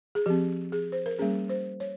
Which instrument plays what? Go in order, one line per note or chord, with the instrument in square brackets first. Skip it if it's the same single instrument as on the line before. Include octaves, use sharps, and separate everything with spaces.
[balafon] G#4
F3 C4 G4
G#4
C5
A#4
G3 A#3 C#4 G#4
C5
C#5